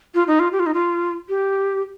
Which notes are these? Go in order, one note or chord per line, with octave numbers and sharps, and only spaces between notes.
F4
D#4
F4
G4
F4
D#4
F4
G4